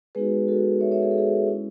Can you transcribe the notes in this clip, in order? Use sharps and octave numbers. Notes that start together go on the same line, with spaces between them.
G#3 B3 D#4 F#4 G#4 B4
F#4 A4
C#5 E5
C#5 E5
G#4
A4
G#4
G#3 C#4 E4